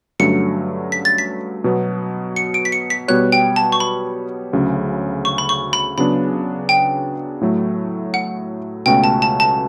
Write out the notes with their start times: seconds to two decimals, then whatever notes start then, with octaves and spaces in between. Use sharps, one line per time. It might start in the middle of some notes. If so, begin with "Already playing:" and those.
0.19 G2 D3 F#3 A3 C#4 C#7
0.92 B6
1.05 A6
1.18 B6
1.64 B2 F#3 B3
2.36 C#7
2.54 D7
2.65 B6
2.72 C#7
2.90 B6
3.08 B2 G3 B3 F#4 C#5 F#6
3.32 G5
3.56 A5
3.72 C#6
3.80 B5
4.53 D2 C#3 F#3 C#4
5.25 C#6
5.38 B5
5.49 C#6
5.73 B5
5.98 C#3 F#3 B3 D4 B5
6.69 G5
7.41 A2 F#3 A3
8.14 F#5
8.86 C#2 B2 A3 C#4 F#4 G5
9.04 A5
9.22 A5
9.40 A5